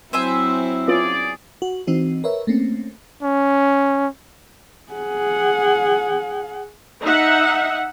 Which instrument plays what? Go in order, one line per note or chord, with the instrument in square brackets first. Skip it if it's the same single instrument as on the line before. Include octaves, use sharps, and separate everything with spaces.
[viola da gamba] F#3 C4 E4 [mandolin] C5 E5 G#5
[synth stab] B3 C#4 F4 [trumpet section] G#4 D5
[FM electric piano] F#4
E3 C4 D#4 F#4
A#4 B4 C#5 E5
A3 A#3 C4 C#4
[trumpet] C#4
[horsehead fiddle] G#4 F#5
[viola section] D#4 E5 F#5